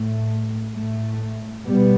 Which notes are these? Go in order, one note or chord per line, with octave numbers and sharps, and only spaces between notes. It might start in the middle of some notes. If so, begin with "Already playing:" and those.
Already playing: A2 A3
A2 A3
B2 G3 B3